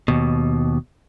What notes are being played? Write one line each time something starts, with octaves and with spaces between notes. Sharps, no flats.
D#2 B2